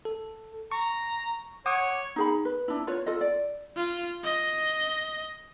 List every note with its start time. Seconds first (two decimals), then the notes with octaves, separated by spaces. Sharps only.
0.05 A4
0.72 A#5 C#6
1.66 C#5 F#5 D6 D#6
2.16 D#4 G#4 B5
2.45 B4
2.68 D4 E4
2.87 F4 B4 C#5
3.06 F4 A4 D#5
3.21 D5
3.76 F4
4.24 D#5